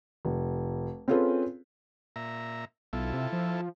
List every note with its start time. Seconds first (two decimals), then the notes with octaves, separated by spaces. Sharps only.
0.25 F1
1.08 C4 C#4 F4 G#4 A4 B4
2.16 A#2 E5 A#5
2.93 B1 E4 F4 A4
3.13 C3
3.32 F3